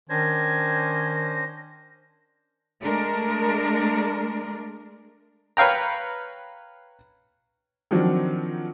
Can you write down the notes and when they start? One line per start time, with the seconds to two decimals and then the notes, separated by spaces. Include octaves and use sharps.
0.10 D#3 C#4 D4 C5 G#6 A#6
2.82 G#3 A3 D4 A#4
5.57 B4 C#5 F5 G5 A#5
7.91 D#3 F3 F#3 C4 D4 F#4